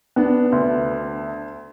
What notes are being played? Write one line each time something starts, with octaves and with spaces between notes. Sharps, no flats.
B3 D4
D2